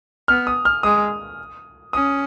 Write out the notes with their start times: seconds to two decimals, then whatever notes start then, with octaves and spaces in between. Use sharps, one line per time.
0.28 B3 F6
0.47 D#6
0.65 F6
0.83 G#3 D#6
1.93 C#4 D#6